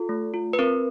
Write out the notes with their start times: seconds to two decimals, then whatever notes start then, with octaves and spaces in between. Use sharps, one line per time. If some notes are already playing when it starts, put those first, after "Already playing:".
Already playing: F4 A4
0.09 A3
0.34 F4
0.53 B4
0.59 C4 A#4